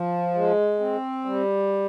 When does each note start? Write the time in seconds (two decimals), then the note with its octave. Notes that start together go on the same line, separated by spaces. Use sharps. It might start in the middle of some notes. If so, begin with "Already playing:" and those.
Already playing: F3
0.35 G#3
0.80 C4
1.25 G3